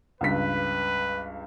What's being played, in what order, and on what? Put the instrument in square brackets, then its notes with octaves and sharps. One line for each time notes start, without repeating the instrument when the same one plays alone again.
[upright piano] C#2 G2 B6 [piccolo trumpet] B4